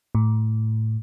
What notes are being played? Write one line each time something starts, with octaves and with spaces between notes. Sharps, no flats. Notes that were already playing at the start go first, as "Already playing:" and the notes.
A2